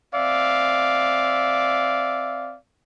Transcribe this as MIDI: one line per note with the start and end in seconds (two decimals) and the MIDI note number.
0.13 2.56 60
0.13 2.56 74
0.13 2.56 76
0.13 2.56 77